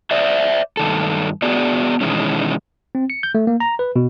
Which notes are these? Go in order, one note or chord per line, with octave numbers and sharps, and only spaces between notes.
C5 D5 E5
G2 D#3 A4
B3 F#4 G#4 D5
B2 D#3 E3 G#3 C#4
C4
C#7
G6
A3
A#3
A#5
B4
B2